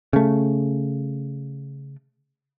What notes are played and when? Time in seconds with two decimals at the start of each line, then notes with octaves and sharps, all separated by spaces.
0.13 C#3 A3